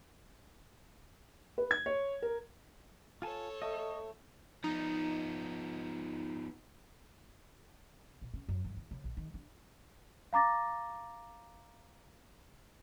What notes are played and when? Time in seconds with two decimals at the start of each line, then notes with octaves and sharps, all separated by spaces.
1.58 B4
1.71 G#6
1.86 C#5
2.22 A#4
3.22 F4 A4 C#5 G#5 A5
3.62 A3 D#5
4.64 F3 B3 D#4
8.21 A#1
8.34 C#4
8.49 F#2
8.65 G2
8.77 E2
8.91 C#3
9.04 A#1
9.17 D#3
9.34 D4
10.33 F5 A#5 D6 A6 A#6